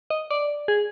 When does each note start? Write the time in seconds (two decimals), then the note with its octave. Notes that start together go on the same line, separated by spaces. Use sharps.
0.10 D#5
0.30 D5
0.68 G#4